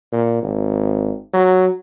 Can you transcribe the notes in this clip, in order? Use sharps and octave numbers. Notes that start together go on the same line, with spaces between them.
A#2
G#1
F#3